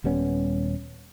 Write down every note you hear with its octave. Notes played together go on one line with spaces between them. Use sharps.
D#1 G3 B3 C#4